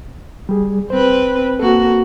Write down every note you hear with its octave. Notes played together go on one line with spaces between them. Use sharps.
G3 G#4
C4 B4 C5
A#3 F#4 A4